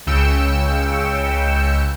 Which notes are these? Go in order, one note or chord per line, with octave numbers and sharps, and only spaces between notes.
C#2 C#3 G5 E6 C#7 E7